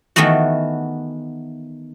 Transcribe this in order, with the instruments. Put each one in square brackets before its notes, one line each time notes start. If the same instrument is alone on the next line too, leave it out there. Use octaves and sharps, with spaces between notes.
[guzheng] D#3 E3 A3 B3 F#4